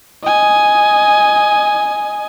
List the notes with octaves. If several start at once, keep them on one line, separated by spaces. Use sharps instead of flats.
D#5 G#5